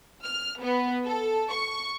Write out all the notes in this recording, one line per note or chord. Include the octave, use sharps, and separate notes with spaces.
F6
B3
A4
C#6